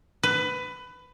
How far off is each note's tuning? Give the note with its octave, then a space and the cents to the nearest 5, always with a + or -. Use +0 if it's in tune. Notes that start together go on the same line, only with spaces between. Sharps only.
B4 +20